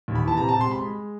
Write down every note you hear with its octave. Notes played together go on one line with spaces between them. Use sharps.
D#2
B5
E3
A5
C3 A#5
C3 A5
C6
G#3 B5
G#3